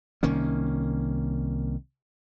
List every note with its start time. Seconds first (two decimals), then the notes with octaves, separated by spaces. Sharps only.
0.23 C2 D#3 A#3 C#4